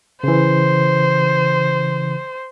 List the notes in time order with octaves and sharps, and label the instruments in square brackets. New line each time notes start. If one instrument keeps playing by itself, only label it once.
[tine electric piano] C#3 E3 [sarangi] C5